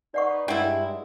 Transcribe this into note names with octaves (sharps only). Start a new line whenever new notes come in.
D#4 B4 D5 D#5 F#5 C#6
G2 G3 G#3 E4 F#5